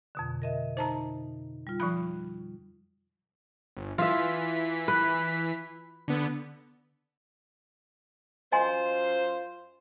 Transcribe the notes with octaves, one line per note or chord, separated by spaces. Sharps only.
F2 B2 D3
A#4 D#5 E5
D#4 C5 A5 A#5
G3 F4
F3 G3 B5 D#6
G1
E3 F4 E5 B6
B4
D3 B3
F#2 F4 C5 D#5 G#5 C6